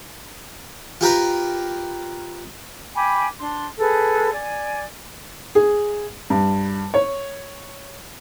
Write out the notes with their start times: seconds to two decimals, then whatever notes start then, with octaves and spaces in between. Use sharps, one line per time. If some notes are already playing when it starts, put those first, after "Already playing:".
1.01 F4 G4 A#4 B4
2.96 G5 G#5 B5 D6
3.39 D4 C6
3.79 G#4 A4 B4
4.33 D5 G#5
5.55 G#4
6.30 G2
6.94 C#5